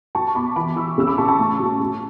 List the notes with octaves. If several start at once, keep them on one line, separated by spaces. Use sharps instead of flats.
F#3 A5 C#6
B2 B5 D6
E3 B5 D6
E3 C#6 E6
C#3 E6
B5 D6
C#3 A5 C#6
A5 C#6
A2
F#3
F#3